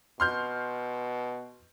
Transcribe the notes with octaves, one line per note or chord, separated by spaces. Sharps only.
B2 C6 F6 G6